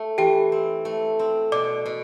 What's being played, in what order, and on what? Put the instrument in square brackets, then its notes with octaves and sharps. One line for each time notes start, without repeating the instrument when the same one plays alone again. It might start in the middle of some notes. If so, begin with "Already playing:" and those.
Already playing: [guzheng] A3
[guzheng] E3 [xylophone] G4 G5
[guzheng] C4
A3
C4
[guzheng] B2 [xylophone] D5 D6
[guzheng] B2